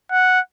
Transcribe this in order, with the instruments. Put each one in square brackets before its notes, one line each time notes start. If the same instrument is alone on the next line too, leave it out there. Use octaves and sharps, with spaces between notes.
[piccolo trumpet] F#5